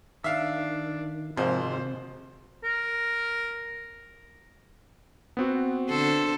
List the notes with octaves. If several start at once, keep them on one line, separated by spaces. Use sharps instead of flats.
D#3 D4 E5 F5
G#1 G#2 C3 F3 C5
A#4
B3 C4 F#4
D3 A4 C5